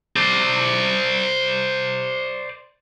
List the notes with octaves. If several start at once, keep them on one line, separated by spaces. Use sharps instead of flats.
C5 D5